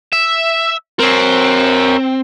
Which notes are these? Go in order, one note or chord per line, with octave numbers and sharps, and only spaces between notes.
E5
C4 A#4 C#5